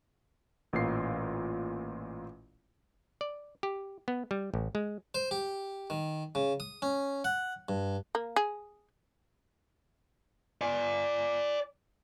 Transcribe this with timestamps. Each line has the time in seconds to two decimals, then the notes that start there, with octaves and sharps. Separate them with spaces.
0.73 A1 A#2 F4 C7
3.21 D5
3.63 G4
4.08 B3
4.31 G3
4.54 A1
4.75 G#3
5.15 C5
5.31 G4
5.90 D#3
6.35 C#3
6.60 D#6
6.82 C#4
7.24 F#5
7.69 G2
8.15 A#3
8.36 G#4
10.61 D5 G#5